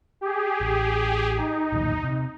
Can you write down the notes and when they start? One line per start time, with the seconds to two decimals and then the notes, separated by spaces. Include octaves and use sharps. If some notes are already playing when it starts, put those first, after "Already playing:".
0.21 G4 G#4
0.61 A1
1.38 D#4
1.73 D1 A#1 D#2
2.03 C3